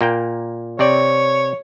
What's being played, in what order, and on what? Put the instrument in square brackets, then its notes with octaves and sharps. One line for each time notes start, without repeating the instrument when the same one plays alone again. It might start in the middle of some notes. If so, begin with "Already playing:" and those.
[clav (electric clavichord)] A#2 A#3 G5
[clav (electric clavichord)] C3 C4 D5 [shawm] C#5